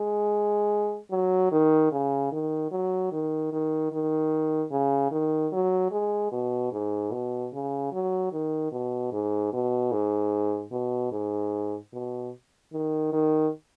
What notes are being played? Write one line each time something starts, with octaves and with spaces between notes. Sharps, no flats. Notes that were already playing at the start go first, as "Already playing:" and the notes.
Already playing: G#3
F#3
D#3
C#3
D#3
F#3
D#3
D#3
D#3
C#3
D#3
F#3
G#3
B2
G#2
B2
C#3
F#3
D#3
B2
G#2
B2
G#2
B2
G#2
B2
D#3
D#3